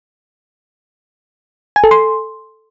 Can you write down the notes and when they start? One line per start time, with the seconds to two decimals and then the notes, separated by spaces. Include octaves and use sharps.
1.76 G#5
1.84 A4
1.91 C6